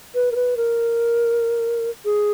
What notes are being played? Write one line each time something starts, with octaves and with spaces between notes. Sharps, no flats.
B4
A#4
B4
A#4
G#4